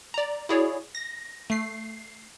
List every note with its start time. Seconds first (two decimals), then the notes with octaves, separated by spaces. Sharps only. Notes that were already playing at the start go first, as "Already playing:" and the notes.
0.14 D5 A#5
0.49 E4 F#4 G#4 C#5 D5
0.95 A#6
1.50 A3 C7